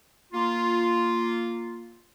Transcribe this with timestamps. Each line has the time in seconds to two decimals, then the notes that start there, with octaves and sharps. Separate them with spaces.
0.33 A#3 F4